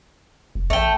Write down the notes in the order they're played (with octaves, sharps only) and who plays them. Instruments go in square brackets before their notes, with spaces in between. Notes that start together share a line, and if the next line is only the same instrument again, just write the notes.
[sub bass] F1
[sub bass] A1 [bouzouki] A3 G5